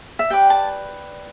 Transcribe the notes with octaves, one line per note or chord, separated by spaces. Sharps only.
E5
G4 B4 D5 G5
A5